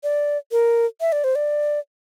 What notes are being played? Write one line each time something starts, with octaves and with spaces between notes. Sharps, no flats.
D5
A#4
E5
D5
C5
D5